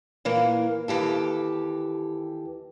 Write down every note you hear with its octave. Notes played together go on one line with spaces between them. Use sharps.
A#2 E3 A#3
D#2 E3 G4 A4